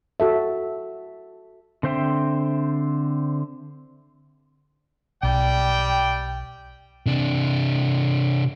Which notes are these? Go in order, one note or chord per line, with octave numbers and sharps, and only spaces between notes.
F#4 A4 E5
D3 C4 C5 E5 G5
B1 G3 D5 G5
C3 D4